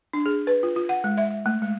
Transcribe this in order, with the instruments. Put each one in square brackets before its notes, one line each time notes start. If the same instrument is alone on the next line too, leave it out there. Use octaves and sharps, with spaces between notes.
[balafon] D4
G#4
B4
F4
F4
F#5
G#3
E5
A3
G#3